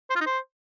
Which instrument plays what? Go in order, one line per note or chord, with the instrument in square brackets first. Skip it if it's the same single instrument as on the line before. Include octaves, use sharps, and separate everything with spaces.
[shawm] C5
F4
D#4
C5